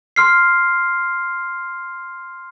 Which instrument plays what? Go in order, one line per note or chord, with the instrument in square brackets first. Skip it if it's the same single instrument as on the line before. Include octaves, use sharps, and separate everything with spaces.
[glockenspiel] C6 F6 C7